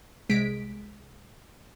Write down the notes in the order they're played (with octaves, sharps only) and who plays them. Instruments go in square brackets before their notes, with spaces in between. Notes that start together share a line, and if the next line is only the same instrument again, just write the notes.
[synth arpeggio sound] C2 G#3 B6 D7